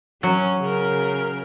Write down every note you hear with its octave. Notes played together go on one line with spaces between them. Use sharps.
F#3 C#4
C#3 A#4